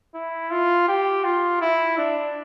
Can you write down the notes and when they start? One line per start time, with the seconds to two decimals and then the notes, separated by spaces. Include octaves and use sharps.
0.14 E4
0.51 F4
0.88 G4
1.24 F4
1.61 E4
1.98 D4